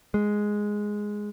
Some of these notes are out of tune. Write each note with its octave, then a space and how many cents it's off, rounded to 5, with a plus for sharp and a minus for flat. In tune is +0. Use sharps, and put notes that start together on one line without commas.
G#3 +0